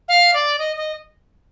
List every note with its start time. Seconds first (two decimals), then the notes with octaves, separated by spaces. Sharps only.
0.08 F5
0.34 D5
0.59 D#5
0.77 D#5